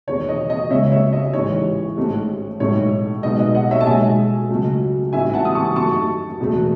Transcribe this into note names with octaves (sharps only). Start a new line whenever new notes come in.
E1 E2 D#3 C#5
D#5
D#5
C#2 C#3 G#3 B3 C#5 E5
C#5 E5
D#5
A1 G#2 E3 G#3 C#5
A1 G#2 D#3 A3
B1 A2 G#3 D#4 C#5
B1 B2 G#3 B3 D#4 D#5
D#5
D#5 F#5
C#5 E5
A5
B1 B2 G#3 E5 G#5
C#2 C#3 F#3 A3
A1 G#2 E3 E5 G#5
F#5 A5
D#6
A5 C#6
F#2 D#3 A3 D#4 A5 C#6
E1 E2 B2 A3